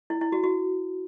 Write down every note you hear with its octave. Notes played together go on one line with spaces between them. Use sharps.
E4
E4
F#4
F#4